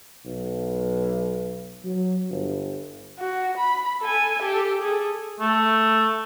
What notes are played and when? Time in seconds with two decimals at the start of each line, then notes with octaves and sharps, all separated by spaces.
0.25 B1
1.84 F#3
2.30 G1
3.19 F#4
3.58 B5
4.01 A4 G#5
4.39 G4 A4
4.81 G#4 A4
5.40 A3